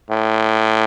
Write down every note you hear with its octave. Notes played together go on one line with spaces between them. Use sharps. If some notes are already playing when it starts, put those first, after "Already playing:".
A2